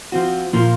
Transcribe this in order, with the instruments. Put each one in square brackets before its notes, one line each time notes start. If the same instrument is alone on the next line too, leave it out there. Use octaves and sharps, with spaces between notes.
[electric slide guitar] F3 C4 F#4
A#2 F3 A#3 F4